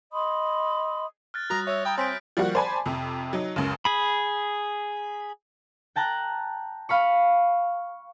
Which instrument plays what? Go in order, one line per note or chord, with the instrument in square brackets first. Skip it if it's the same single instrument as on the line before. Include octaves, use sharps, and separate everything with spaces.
[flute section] D#5 B5 C6 D#6
[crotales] F6 F#6 A6
[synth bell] G3 F#4 [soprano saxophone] A#5 [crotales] D#6 F#6 A#6
[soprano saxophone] C#5 [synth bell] E5 E6
[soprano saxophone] G5 [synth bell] A#5 B5 D#6
[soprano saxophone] C4 [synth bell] C#5 G#5 C6 [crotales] G6 B6 D7
[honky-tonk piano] F3 G3 A#3 F#4 F#5
C5 D5 G#5 A5 B5
F2 C3
F#3 D#4
C#2 F#2 C#3
[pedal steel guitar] G#4 B5
[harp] G5 A5 A#5 F#6
F5 B5 C#6